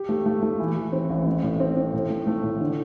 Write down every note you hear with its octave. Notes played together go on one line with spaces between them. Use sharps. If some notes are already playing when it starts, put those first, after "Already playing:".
Already playing: G4
A3
A3
A3
E3
E3
C4
A1
A3
A2
C4
C4
A2
A3
A3
A2
D3